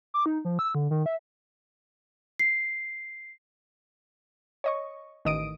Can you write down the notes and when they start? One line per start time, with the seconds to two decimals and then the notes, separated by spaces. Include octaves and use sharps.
0.14 D6
0.26 D#4
0.45 F3
0.59 E6
0.75 D3
0.91 D#3
1.06 E5
2.39 C7
4.64 C#5 D#5 C#6
5.25 A1 D#3 D#5 D#6 D7 D#7